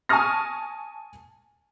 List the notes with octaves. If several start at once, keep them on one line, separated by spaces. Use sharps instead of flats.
G#5 A5 C#6 D#6 F6 A#6